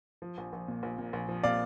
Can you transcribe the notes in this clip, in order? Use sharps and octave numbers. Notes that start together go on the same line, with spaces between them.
F3
A#1
A#1
A#2
A#1
A#2
A#1
F3
A#2 D5 F5